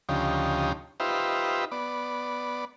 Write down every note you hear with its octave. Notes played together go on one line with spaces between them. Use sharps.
D2 C#3 F3 D#4 G4
D#4 F4 G4 B4 C5 E5
B3 D5